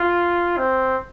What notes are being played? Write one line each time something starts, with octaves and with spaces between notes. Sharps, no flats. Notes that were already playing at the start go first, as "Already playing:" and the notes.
Already playing: F4
C4